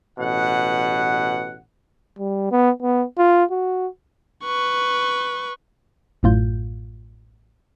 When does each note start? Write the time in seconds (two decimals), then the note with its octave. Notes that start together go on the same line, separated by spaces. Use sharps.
0.19 A1 B2 F#5
2.19 G3
2.51 B3
2.82 B3
3.18 F4
3.51 F#4
4.44 B4 C#6
6.23 A1 F#2 A2 F4 G6